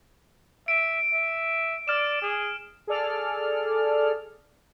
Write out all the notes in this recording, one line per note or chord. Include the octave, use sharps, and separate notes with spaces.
E5 D7
E5
D5 F6 E7
G#4
G#4 A4 D5 F6